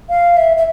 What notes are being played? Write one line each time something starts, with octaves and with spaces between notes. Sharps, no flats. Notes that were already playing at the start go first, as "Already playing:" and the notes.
F5
E5
E5